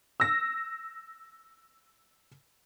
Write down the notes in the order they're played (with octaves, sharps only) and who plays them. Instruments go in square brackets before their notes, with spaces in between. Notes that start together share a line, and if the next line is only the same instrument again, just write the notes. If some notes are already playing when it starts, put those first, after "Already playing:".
[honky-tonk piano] E6 A#6